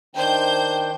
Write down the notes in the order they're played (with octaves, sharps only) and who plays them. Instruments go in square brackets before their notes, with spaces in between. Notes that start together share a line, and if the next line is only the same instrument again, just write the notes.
[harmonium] D#3 D4 G5 [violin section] C5 G6